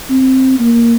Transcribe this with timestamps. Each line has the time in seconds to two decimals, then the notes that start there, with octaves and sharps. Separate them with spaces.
0.10 C4
0.59 A#3